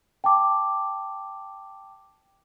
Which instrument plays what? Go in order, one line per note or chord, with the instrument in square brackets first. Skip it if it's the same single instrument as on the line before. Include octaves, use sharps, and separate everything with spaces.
[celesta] G5 A5 D6